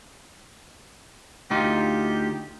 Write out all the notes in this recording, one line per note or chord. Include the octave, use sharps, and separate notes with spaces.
D2 D#4 F4 G4